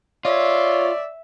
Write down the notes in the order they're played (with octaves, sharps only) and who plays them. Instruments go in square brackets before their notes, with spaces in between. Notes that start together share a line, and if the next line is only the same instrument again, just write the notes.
[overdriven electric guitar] F4 [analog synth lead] C#5 [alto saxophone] D5 [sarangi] E5